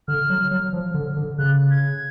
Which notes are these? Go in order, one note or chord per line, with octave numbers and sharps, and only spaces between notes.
D3 F6
F#3
F#3
F3
D3
D3
C#3 F#6
G#6